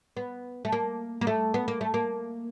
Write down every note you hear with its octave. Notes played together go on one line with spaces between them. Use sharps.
B3
A3
A#3
A#3
A3
B3
A#3
A3
A#3